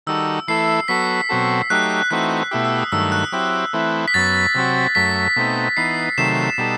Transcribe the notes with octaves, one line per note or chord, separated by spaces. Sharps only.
D#3 G3 D#4 F#4 A4 E6
E3 A3 E4 A4 C7
F#3 B3 F#4 A4 B6
B2 F#3 C4 F#4 A4
F#3 A3 D#4 G4 F#6
E3 A3 C4 D#4 F#4 F#6
B2 A3 E4 G4 E6
E6
D#6
G2 D#3 F#3 A3 E6
F#6
F#3 C4 E4 G4
E3 A3 C4 E4
B6
F#2 F#3 B3 A6
C3 F#3 C4 F#4
F#2 F#3 A3 B6
B2 A3 C4 D#4
E3 B3 D#4 C7
C3 D#3 F#3 A3 C7 E7
B2 G3 D#4 A4